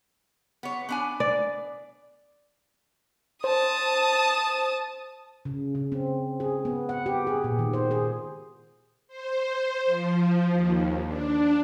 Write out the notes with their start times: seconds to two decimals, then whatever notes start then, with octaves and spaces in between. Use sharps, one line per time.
0.63 B3 C#5
0.89 B3 D4 G#5
1.20 D5
3.44 C5 A5 D#6
5.45 C#3
5.75 C#3
5.92 C4
6.40 G#4
6.65 B3
6.89 F#5
7.06 G4
7.27 G#4
7.44 A#2
7.59 D#3
7.73 C5
7.91 G#4
9.08 C5
9.86 F3
10.51 D#2
11.06 D4